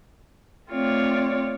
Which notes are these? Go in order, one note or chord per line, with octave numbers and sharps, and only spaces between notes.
A3 C4 F4 C#5 D5